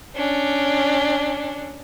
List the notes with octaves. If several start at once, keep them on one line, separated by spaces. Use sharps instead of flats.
C#4 D4